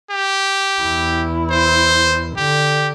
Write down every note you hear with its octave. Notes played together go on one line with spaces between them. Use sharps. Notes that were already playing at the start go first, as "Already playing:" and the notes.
G4
E2 E4
C5
D3 G4